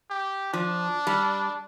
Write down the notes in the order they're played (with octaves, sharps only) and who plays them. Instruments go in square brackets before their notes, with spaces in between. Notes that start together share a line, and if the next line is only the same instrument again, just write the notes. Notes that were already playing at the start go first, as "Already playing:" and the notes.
[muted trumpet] G4
[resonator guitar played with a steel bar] F3 [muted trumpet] D4
[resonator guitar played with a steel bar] G3